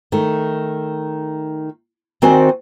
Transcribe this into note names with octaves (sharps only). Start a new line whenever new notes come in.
D#3 A3
D#3 C4 F#4 C5 D5 G#5